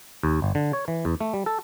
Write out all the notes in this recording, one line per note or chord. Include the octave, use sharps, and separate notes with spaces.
D#2
G1
D3
C#5
E3
E2
A3
G3
A4